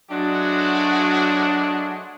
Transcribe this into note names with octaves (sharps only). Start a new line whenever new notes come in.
F#3 G#3 A3 D4 F#4